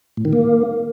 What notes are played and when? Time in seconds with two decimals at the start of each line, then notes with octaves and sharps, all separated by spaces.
0.17 A2
0.25 D#3
0.33 A#3